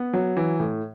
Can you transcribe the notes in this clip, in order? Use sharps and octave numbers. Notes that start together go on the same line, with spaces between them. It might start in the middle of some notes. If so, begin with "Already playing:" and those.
Already playing: B3
F#3
E3
A2